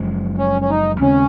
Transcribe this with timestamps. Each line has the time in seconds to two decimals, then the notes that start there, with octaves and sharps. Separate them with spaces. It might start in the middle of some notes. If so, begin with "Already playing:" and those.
Already playing: F#1 F#2 F3 G#3
0.38 C#4
0.62 C#4
0.70 D#4
1.00 D#2 C#3 G#3 C4 C#4